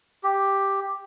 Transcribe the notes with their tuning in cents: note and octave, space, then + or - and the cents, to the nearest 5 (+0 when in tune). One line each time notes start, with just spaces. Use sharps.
G4 +0